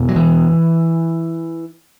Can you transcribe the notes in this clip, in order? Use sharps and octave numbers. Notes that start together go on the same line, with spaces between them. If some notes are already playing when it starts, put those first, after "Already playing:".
Already playing: E2 B2
F#3
E3